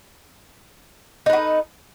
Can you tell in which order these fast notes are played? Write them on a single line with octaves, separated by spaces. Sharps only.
D#4 B4 F#4 A4